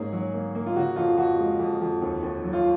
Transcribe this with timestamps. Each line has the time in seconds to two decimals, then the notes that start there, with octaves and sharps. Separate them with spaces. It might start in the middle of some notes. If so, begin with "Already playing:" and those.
Already playing: G#2 A#3 C#4 G#4
0.12 F#3
0.34 A#3
0.55 A#3
0.67 F4
0.76 C#3 F#4
0.96 F2 F4
1.17 F2 F#4
1.39 G#3
1.59 F2
1.81 F2
2.02 D#2
2.23 D#2
2.44 F#3
2.53 F4